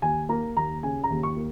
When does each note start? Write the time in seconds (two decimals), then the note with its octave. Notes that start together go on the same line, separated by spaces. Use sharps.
0.02 D#2 G#5
0.29 A#3 A#5
0.56 D#2 A#5
0.83 C#3 G#5
1.04 A#5
1.10 D#2
1.23 C#6
1.37 A#3